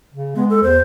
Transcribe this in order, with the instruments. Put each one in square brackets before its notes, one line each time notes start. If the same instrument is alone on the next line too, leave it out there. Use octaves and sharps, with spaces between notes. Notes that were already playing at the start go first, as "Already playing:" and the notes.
[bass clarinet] C#3
[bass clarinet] G#3 [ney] B3
[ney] A4
[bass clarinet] E2 [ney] C5